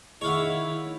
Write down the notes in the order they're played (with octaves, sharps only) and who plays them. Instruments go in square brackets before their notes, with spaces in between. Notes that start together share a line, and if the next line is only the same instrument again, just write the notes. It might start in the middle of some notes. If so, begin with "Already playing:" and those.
[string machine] D#3 [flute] E4 [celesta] G#4 D#5 [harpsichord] C#5 F5 F#5